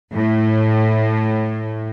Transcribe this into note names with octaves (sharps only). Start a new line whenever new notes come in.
A2